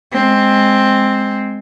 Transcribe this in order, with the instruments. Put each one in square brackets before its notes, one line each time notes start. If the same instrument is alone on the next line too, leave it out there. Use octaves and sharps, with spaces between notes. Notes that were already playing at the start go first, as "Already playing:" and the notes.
[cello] G#3 C4